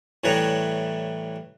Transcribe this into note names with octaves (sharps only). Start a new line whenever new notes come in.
A2 E3 G3 C#5 F#5 A#5